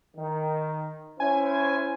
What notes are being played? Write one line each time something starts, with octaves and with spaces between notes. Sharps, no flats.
D#3
C#4 E4 C5 G#5